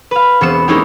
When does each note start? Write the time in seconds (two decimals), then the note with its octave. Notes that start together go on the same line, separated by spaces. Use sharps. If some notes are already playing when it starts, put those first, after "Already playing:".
0.11 B4 F5
0.41 E1 B3 C4 C#7 E7
0.68 G#3 A#3 C#4 D#4 E4 G4